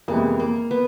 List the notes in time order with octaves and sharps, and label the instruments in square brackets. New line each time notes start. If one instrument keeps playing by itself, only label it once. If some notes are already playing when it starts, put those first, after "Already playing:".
[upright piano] F2 C3 E3 G#3 B3 [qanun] A#3
[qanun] A#3
B3